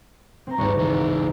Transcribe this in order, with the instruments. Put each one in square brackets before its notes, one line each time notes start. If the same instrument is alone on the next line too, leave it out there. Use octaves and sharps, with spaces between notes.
[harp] C4 C5 A#5
[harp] D#1 G#1 C#6 [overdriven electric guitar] G2 D#3
[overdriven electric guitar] C#2 E3